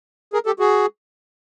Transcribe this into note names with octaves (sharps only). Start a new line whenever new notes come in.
G#4 A#4
G4 A4
F#4 G#4